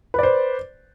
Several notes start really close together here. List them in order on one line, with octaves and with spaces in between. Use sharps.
B4 D5 C5